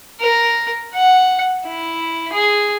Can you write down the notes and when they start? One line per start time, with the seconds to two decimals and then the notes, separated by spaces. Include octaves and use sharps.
0.20 A#4
0.94 F#5
1.67 E4
2.33 G#4